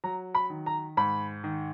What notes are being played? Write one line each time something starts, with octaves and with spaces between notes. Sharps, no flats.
F#3 A#5
B5
D#3
A#5
G#2 B5
D#3